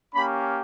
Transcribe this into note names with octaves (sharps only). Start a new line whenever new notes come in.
A#3 C#4 G4 B5